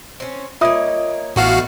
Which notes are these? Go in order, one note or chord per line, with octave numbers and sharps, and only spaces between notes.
C4 C#4
A#3 F4 C#5 D#5 E5 D#6
A1 A3 B3 D#4 F#4 F5